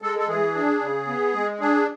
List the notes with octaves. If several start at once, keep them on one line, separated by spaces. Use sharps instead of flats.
G#3 A4
A4
E3 G#4
D4
C#3
B3
G#3
D4 G#4